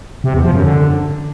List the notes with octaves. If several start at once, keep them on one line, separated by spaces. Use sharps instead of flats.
C3
E2
F3
F#2
D3